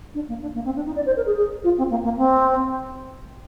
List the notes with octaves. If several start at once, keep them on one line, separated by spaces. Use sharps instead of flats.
D4
A#3
D4
A#3
C4
D4
D#4
D5
C5
A#4
G#4
G#4
F4
C4
A#3
A#3
C4